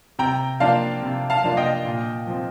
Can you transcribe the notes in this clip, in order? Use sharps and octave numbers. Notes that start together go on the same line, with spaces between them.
C3 G5 A#5
F3 A#3 D4 F4 F5 A5
C3
F5 A5
F3 A#3 D4 F4
D#5 G5
A#2
F3 C4